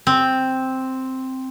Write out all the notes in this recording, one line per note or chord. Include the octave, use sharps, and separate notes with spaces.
C4